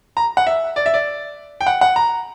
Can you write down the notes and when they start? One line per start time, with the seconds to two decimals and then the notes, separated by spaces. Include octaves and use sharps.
0.17 A#5
0.37 F#5
0.47 E5
0.76 D5
0.86 E5
0.94 D5
1.61 G5
1.67 F#5
1.81 F#5
1.96 A#5